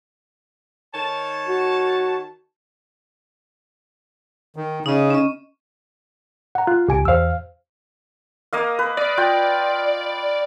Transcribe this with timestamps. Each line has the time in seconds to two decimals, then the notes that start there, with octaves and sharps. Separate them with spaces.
0.93 D#3 C#5 A5
1.47 F#4
4.56 D#3
4.86 C#3 D#4 D#5
5.10 C#4 D#5
6.55 F#5 A#5
6.67 F4 F#6
6.88 C#2 G4 G#5 D7
7.05 E2 C5 F5 E6
8.53 A#3 D#5 F5
8.79 B4
8.97 D5 D#5
9.17 F4 G5